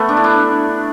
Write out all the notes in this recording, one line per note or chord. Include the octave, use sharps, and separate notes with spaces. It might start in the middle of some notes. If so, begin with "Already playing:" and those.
Already playing: A3 B3
D4
E4
D4